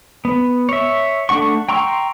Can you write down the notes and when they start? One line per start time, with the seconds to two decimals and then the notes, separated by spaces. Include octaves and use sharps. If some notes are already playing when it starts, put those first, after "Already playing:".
0.25 B3
0.69 C#5 E5
1.29 A3 D4 F#5 C#6
1.69 G5 A#5 C6 C#6 E6